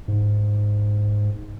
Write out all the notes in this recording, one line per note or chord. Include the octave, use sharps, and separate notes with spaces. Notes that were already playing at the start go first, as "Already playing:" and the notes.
G#2